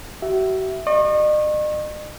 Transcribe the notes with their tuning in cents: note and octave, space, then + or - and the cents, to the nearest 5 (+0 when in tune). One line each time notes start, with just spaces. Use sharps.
F#4 +45 E5 +0
D#5 -45 C#6 -35